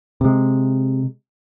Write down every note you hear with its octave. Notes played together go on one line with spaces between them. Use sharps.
C3 G#3